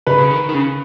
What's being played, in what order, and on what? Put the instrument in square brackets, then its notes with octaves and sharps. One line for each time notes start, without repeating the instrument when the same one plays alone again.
[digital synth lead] C#3 [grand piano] B4
[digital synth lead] C#3
D#3
D#3
C#3